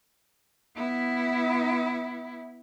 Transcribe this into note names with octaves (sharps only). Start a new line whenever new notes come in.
B3 E4